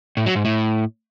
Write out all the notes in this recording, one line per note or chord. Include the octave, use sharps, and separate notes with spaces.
A2
F#3
G#2
A2